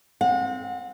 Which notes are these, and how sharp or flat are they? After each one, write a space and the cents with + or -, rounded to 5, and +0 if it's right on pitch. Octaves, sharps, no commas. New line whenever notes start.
C4 +0 F#5 -35